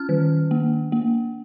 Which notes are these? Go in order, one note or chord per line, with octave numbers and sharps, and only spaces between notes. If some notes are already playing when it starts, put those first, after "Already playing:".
Already playing: C#4 F6
D#3
A#3
A#3